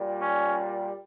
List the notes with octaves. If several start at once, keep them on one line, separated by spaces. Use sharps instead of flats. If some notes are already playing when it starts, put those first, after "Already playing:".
Already playing: A#2 G3
C#4